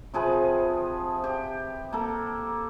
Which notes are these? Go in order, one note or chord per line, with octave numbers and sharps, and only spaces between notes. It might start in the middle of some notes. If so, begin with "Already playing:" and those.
C3 F3 G#4 B4
G4
A#3 A4